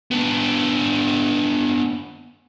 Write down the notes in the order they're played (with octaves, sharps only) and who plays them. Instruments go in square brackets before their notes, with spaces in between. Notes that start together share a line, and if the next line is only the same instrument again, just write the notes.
[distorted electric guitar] B3 D4